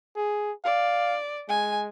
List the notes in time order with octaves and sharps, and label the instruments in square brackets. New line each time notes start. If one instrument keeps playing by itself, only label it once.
[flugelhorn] G#4
[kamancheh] D5 [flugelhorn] F5
[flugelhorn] G#3 [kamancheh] G#5